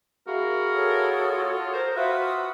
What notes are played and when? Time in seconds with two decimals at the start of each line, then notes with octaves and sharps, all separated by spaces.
0.27 A#3 E4 F#4 G#4 A#4
0.74 A4 C#5 D#6
1.32 F4
1.73 A#4 C5
1.96 F4 F#4 B4 E5 D#6 E6